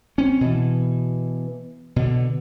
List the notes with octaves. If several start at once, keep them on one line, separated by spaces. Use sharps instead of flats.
C4 C#4
B2 E3
B2 D3